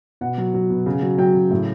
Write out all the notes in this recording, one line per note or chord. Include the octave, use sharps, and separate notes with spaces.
B2 F#5
F#3
F#3
B2
C#3
F#3
F#3 G5
C#3
A2